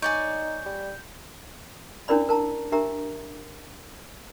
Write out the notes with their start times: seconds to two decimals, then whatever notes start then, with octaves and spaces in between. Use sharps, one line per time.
0.02 D#4 C#5 D5 G#5 G6
0.66 G3
2.08 C#4 D4 E4 A#4 D5 B5
2.29 A#4 A5 A#5
2.72 D4 G4 A#4 E5 A#5